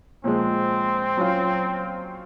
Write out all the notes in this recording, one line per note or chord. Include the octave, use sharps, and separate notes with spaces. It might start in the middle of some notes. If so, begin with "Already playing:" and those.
A#2 F3 G#3 C4
F#3 C#4 F4